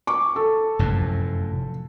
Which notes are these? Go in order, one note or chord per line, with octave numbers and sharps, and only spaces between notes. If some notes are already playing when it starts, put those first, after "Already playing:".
C#6 D6
A4
F1 F#2 A2